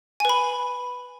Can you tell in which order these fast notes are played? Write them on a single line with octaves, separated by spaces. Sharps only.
G#5 B4 B5